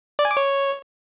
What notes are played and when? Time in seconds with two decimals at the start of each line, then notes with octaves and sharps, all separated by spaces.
0.19 D5
0.25 G#5
0.31 D6
0.37 C#5